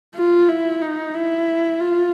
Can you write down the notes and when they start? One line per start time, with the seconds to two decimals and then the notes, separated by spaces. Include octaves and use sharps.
0.16 F4
0.49 E4
0.82 D#4
1.15 E4
1.81 F4